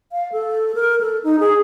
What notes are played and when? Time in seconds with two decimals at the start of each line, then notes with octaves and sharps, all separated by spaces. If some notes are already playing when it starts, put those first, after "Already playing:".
0.12 F5
0.32 A4
0.75 A#4
1.01 A4
1.24 D#4
1.39 G#4